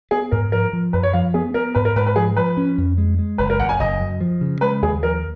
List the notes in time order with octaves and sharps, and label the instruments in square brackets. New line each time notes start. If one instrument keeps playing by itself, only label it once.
[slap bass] B3 [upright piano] G#4
[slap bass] G#2 [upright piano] A#4
[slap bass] F3 [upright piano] A#4
[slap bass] F3
[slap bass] F#2 [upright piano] B4
[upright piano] C#5
[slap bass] F3 [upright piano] F5
[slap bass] B3 [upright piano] G#4
[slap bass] B3 [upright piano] A#4
[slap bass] G#2 [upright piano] B4
[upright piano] A#4
[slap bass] G#2 [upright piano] B4
[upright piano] B4
[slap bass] F3 [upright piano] G#4
[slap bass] F3 [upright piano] B4
[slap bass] C#4
F2
G#3
G#3
[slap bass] F#1 [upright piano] B4
[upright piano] A#4
[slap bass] F#1 [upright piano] F#5
[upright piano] G#5
[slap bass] F#1 [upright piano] D#5
[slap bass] F#2
F3
C#3
[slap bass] G#3 [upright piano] B4
[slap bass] D#2 [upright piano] G#4
[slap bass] F3 [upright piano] A#4